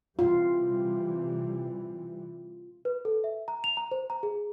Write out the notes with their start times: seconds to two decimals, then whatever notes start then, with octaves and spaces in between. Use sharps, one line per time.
0.19 C3 E3 G3 F4
2.85 B4
3.05 A4
3.24 E5
3.48 A#5
3.64 F7
3.77 A#5
3.91 C5
4.10 A#5
4.23 G#4